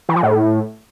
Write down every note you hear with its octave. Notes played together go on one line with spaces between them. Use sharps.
E3
F3
A2